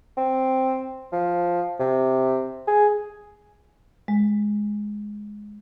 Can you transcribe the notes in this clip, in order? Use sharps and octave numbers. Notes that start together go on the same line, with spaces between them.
C4
F3
C3
G#4
G#3